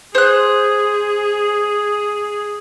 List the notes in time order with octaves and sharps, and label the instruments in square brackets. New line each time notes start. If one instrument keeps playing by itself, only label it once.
[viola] G#4 [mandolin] C5 F#6